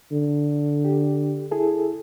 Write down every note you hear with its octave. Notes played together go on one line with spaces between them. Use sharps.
D3
G4
E4 G#4 A4